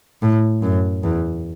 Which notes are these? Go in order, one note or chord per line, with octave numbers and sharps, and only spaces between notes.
A2
F#2
E2